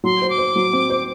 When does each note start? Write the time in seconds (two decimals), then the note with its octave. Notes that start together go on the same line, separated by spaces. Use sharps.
0.04 F#3 C6
0.22 C5
0.30 D6
0.38 C5
0.56 F#3
0.73 C4
0.90 C5